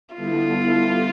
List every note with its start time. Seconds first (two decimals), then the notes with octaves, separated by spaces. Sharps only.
0.14 D3 G3 B3 E4 F4 A4